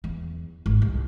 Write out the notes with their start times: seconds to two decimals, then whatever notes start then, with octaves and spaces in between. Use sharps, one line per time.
0.04 E2
0.66 G#1
0.82 C2